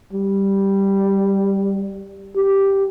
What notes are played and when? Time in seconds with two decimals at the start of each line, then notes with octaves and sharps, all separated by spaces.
0.13 G3
2.36 G4